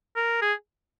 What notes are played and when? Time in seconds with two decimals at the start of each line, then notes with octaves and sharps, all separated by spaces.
0.16 A#4
0.42 G#4